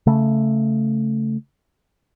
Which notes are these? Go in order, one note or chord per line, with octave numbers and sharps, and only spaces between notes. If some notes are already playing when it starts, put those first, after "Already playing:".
C#3 A3